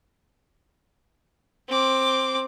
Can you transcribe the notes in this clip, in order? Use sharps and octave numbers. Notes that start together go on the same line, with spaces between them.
C4 D6